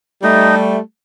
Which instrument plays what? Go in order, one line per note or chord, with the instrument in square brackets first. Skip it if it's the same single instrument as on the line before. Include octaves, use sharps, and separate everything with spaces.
[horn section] G3 A3 [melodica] D#4